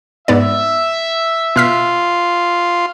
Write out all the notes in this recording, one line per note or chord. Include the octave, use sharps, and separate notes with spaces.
G#2 B3 D5 E5
B2 F4 F6 B6